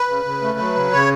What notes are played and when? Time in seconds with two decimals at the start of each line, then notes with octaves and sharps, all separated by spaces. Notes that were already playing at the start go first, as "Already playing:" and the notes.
Already playing: B4
0.08 C#3
0.25 C#3
0.42 A3
0.59 F#3
0.75 C#3
0.92 C#3 C#5